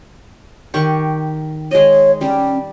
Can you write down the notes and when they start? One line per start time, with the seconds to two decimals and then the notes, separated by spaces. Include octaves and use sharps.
0.74 D#3 G4 C#6
1.71 G#3 C#5 D#5
2.21 G3 C#4